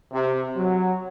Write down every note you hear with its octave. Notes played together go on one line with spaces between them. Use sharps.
C3
F#3